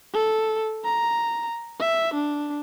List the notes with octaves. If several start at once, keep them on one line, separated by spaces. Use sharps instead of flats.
A4
A#5
E5
D4